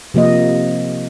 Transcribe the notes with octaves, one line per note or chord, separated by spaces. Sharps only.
C3 F3 A#3 D#5